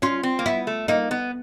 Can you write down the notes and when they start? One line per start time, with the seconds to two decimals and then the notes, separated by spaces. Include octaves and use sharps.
0.02 C#4 F4
0.23 C4
0.39 A#3
0.46 B3 E4
0.67 A3
0.88 A#3 D#4
1.11 B3